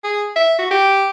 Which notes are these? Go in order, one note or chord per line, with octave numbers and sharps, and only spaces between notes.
G#4
E5
F#4
G4